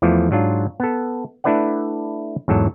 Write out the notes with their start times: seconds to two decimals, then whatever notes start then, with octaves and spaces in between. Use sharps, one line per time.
0.02 E2 E3 F3 A3
0.31 G#2 F#3 D4 F4
0.80 B3 A4
1.44 A3 D4 E4 B4 D5 F#5
2.48 E2 G#2 F#3 A4